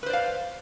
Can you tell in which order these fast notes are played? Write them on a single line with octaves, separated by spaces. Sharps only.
B4 C5 D5 F5